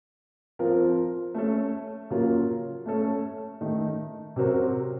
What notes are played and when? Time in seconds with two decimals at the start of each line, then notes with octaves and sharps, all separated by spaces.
0.59 F3 C4 F4 A#4
1.35 A3 C#4 A4
2.10 C#3 F#3 A#3 F4 A#4
2.86 A3 C#4 A4
3.61 D#3 A3 D#4
4.36 C3 F#3 C4 F#4 A#4